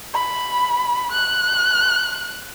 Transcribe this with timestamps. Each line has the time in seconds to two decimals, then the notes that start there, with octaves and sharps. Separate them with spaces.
0.14 B5
1.12 F#6